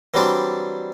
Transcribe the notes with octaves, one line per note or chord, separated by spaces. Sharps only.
E3 F#3 G3 C4 D4